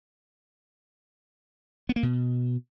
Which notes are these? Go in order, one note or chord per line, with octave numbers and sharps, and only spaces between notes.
B3
A#3
B2